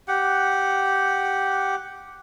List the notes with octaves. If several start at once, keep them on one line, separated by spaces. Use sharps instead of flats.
G4 F#5